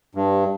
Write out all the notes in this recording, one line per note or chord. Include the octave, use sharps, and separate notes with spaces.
G2